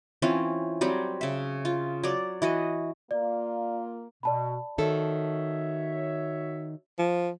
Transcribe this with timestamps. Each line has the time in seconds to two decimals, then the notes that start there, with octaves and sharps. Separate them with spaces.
0.22 E3 C4 C#4 F4
0.81 F#3 G3 C4
1.21 C#3 E5
1.65 F4
2.03 F#3 D5
2.42 E3 F#4 D#5
3.11 A#3 F4 D5
4.23 B2 D5 A5 B5
4.78 D#3 F#4 A4 C#5 E5
6.99 F3